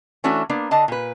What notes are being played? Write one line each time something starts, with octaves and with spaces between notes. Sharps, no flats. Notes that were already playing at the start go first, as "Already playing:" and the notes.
E3 A3 C#4 D4 F#4
A#3 B3 D4
D3 D4 D#5 A5
A#2 B4